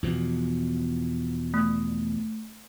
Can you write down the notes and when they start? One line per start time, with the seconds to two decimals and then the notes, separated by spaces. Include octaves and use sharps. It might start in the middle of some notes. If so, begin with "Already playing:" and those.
0.03 E2 B2 F3
1.54 A3